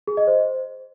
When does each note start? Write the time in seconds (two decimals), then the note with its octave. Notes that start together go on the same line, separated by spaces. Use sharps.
0.07 G#4
0.17 D#5
0.27 C5